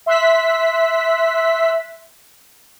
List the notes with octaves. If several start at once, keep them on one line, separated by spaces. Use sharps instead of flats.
E5 C6 E6 F#6 B6